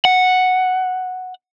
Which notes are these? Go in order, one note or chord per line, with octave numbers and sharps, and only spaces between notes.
F#5